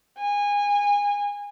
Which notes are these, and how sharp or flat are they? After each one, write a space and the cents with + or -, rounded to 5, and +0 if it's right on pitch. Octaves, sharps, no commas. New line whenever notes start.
G#5 -25